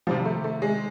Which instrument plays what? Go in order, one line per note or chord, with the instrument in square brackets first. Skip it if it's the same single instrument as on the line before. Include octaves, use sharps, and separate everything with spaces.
[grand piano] C3 D#3 G3 C4 [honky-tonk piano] F3
[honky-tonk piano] A3
A3
G#3